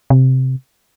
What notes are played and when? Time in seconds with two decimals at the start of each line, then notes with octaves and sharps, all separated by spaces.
0.10 C3